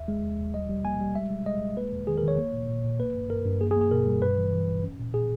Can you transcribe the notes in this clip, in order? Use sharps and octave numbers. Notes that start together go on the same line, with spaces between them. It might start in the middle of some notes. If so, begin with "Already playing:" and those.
Already playing: D#2 E5
G#3
D#2
D#2
G3 D#5
G3
A#3 G#5
G3
G#3 E5
G#3
G#3 D#5
G#3
A#3 B4
E2
D#3 G#4
A#4
D#3 C#5
A#3
A#2
A#2
A#2
A#3 B4
G2
G2 A#4
G2
A#3 G#4
G#4
A#3
G#4
B2 A#4
G3
G2 B4
E3
E3
G1
C#4
A#2
A#2 G#4